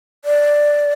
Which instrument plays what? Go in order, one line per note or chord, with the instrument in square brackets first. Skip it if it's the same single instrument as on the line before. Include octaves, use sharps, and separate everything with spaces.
[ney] D5